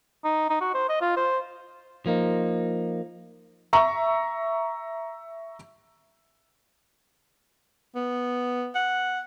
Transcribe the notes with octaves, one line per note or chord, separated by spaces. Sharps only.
D#4
D#4
F#4
C5
D#5
F4
C5
F3 A#3 D#4
E5 A#5 C#6
B3
F#5